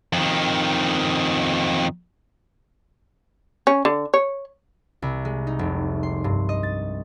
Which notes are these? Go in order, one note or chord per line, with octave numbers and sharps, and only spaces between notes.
F2 D#3
C#4
D3
C#5
C2
G#3
D#4
F1
C6
G2
D#5
A6